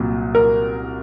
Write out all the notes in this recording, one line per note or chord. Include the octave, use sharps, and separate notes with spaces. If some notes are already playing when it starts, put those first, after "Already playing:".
Already playing: C2 A#2 F#3
A#4